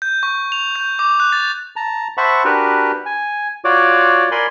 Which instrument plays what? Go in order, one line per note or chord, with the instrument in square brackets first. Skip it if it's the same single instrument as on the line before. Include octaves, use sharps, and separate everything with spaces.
[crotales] G6
C#6
F7
G6
D6
F#6
A6
[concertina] A5 A#5
C5 E5 F#5 A5 B5 C#6
D4 F#4 G4 A#4 B4
G#5
F4 F#4 C#5 D5 D6
A#4 D5 G#5 B5 C6